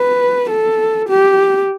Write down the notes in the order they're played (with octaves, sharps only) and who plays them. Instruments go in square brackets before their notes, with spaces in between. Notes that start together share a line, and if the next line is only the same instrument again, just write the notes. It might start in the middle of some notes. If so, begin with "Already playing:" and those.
Already playing: [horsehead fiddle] B4
A4
G4